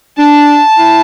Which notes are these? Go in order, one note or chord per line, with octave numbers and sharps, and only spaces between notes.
D4 A5
E4